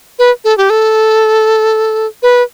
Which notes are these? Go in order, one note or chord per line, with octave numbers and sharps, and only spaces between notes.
B4
A4
G4
A4
B4